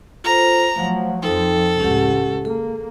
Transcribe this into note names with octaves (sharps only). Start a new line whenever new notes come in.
F4 A4 C5 A#5
F3 F#3 A3 F5 F#5
F2 F3 D#4 A4 G5
C#2 A2 C#4 G4 F#5
A#3 G#4 A4